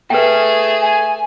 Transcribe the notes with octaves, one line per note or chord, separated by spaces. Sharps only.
A3 G#4 B4 G5
G#5